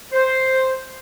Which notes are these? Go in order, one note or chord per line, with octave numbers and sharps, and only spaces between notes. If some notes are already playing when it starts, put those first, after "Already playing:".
C5